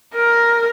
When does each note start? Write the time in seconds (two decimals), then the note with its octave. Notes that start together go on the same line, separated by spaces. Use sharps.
0.15 A#4